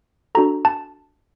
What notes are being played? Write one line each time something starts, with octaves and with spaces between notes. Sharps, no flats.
D4 F#4 A4 A#5
A5